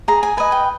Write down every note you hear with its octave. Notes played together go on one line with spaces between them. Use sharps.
G#4 A#5
G#5
B4 D#5 G#5
G5